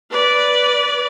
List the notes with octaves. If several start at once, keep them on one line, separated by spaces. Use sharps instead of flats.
B4 D5